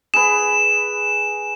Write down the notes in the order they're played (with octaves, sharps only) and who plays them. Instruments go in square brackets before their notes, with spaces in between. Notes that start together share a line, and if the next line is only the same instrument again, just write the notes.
[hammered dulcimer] G#4 B4 [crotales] E7